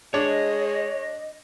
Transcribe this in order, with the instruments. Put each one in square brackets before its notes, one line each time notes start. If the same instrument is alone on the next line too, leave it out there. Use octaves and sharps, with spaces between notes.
[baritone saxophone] G#3 [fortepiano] D4 [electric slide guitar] C#5 [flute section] D#5